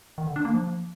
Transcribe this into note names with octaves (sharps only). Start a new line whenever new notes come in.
D#3
D3
D4
A#3
F3